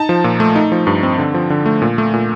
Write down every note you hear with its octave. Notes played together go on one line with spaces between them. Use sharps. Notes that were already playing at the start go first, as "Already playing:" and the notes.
Already playing: D#4 A5
F3
A#2
A3
D#4
F3
G2
C4
D3
F3
D3
A3
A#2
A3
A#2